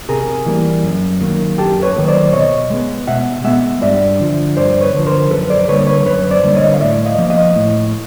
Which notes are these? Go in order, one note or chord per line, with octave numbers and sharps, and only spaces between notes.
C3 G#4 A#4
E3 G3 A#3
F#2
D#3 F#3 A#3
F#2 G4 A4
B4 C#5
D#3 F#3 A#3
C5 D5
B2 C#5 D#5
G#3 B3
B2 E5 F#5
G#3 B3 E5 F#5
G2 D5 E5
D3 F3
G2 C5 D5
B4 C#5
D3 F3
A#4 C5
F#2 A4 B4
C5 D5
D3 G3 A#3 B4 C#5
B4 C#5
F#2 B4 C#5
C5 D5
D3 G3 A#3
C#5 D#5
F5
A2 D5 E5
D#5 F5
F3 A#3
D#5 F5
A2